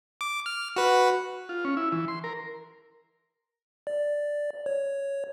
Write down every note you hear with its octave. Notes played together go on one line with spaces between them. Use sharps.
D6
F6
F#4 B4
F4
C#4
E4
E3
C6
A#4
D5
C#5